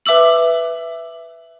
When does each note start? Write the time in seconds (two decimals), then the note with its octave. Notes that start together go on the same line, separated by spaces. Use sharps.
0.06 B4 E5 D6 E6 F#7